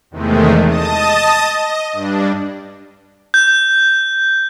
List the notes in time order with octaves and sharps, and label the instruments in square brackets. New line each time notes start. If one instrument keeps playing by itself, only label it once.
[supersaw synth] E2 C3 D#3 G#3 A3
D#5 A5 D#6
D#5
G2 D4
[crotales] G6